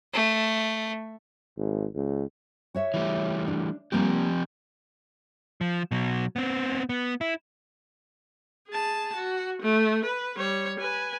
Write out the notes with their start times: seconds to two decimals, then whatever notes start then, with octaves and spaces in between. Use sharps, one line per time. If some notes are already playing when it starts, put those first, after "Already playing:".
0.14 A3
1.57 G#1
1.95 C#2
2.75 F#4 C#5 E5
2.94 E3 G3 A3
3.48 D4
3.92 F3 G3 A#3 C4 G4
5.61 F3
5.91 B2 F#3
6.36 B3 C4
6.89 B3
7.21 E4
8.69 G#4 A5
9.15 F#4
9.61 A3
10.04 B4
10.38 G3 C#5
10.79 B4 G#5